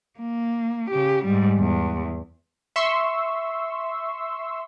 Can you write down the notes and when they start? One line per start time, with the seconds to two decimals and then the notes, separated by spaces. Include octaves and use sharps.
0.19 A#3
0.90 C#3 G4
1.25 G#2 G3
1.58 E2
2.76 E5 C6 C#6 E6